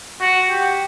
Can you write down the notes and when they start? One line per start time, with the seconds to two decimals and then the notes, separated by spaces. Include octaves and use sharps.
0.20 F#4
0.49 G4